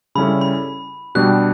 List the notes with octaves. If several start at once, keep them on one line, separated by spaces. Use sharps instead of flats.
C#3 G3 C#4 E4 A4 B5
B5
B2 G3 D4 G4 F#6